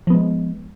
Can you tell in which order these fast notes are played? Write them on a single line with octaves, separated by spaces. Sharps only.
F3 B3 G#3